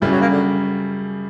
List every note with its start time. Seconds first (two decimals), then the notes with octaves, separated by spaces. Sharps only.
0.02 F#2 C#3 E3 G3
0.12 F#3
0.21 A#3
0.32 D3